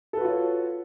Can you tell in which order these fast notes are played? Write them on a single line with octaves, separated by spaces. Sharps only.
A4 B4 F#4 F4 C#5